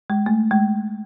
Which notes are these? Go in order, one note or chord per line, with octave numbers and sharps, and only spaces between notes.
G#3
A3
G#3